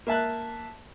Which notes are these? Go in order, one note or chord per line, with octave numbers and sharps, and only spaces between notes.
A#3 E5 A5 F#6